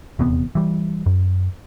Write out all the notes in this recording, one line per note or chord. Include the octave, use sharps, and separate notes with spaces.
D#1 E2 C3 B3
E3 G3
F#2